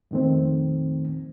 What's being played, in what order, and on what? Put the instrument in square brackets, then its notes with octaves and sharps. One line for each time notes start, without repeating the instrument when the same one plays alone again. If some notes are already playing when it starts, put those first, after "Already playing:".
[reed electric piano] F2 A#2 D#3 A3 C4